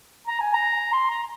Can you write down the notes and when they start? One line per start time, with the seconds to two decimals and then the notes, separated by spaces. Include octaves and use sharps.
0.27 A#5
0.41 G#5
0.54 A#5
0.93 C6
1.10 A#5